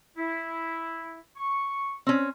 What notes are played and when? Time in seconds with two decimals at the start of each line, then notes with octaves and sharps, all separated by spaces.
0.17 E4
1.37 C#6
2.07 C4 C#4